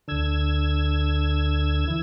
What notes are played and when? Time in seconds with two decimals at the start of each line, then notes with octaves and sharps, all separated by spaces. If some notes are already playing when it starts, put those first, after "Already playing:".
0.08 D2 D3 E6 G#6
1.88 E3